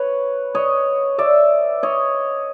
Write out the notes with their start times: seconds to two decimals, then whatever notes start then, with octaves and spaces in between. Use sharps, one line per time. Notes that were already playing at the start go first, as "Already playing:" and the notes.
Already playing: B4 C#5
0.55 C#5 D#5
1.18 D5 E5
1.83 C#5 D#5